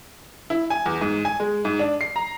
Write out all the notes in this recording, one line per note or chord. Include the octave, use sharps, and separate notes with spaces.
E4
G#5
E2
G#2
G#5
G#3
G#2
D4
C7
A#5